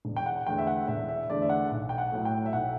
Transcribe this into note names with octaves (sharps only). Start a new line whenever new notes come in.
E1
G5
F#5
E2 D3 A3 G5
E5
F#5
E1 E5
E5
E2 D3 A3 D5
E5
F#5
B1
G5
F#5
A2 F#3 A3
G5
E5
B1 F#5